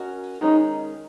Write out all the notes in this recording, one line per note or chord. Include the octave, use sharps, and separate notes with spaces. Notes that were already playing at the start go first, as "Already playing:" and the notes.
Already playing: C#4 F#4 A#4 D#5
D#3 G#3 C#4 D#4